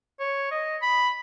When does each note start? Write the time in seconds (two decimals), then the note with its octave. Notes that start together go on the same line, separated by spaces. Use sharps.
0.20 C#5
0.51 D#5
0.82 B5